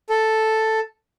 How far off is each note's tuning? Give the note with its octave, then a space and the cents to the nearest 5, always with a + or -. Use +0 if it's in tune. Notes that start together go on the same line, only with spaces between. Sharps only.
A4 +0